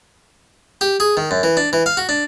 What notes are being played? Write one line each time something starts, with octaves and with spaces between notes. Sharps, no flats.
G4
G#4
D#3
F#2
E3
D4
E3
F5
F#4
D4